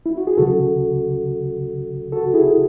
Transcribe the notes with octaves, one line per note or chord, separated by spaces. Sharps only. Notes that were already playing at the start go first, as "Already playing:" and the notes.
E4
F#4
G#4
C#2 C#3 F#3 F#4 A4
F#4 A4
E4 G#4